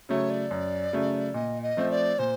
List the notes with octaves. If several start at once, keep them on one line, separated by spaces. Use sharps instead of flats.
C#3 F#3 A3 C#5
D5
F#2
C#3 F#3 A3
A#2 D#5
D#5
F3 A3 C4
D5
A#2 C5